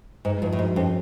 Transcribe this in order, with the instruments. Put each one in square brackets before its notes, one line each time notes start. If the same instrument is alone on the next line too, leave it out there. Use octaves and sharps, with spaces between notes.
[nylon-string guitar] G#2 [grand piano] G#3
[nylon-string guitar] G2 [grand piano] F3
[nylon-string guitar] A2
[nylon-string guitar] G#2 [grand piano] F#4
[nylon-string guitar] F2 [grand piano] C#4